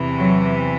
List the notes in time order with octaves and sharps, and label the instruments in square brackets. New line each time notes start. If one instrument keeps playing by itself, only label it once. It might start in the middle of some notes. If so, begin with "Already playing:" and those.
Already playing: [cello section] E2 C3 E3
F#3